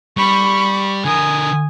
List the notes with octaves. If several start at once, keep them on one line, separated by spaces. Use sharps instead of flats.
G3 B5 C#6
D3 A#4 G#5 D#6